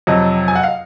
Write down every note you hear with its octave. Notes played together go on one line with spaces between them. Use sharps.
F2 C3 F#3 D#5
G#5
F#5
F5